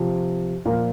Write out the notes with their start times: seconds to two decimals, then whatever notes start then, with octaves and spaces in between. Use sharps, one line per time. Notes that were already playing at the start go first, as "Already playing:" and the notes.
Already playing: C3 F3
0.65 A#2 F3 A#4